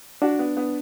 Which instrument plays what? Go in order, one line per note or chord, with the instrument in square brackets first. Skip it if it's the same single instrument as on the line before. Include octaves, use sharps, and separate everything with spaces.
[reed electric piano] D4 [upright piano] F#4
[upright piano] B3
B3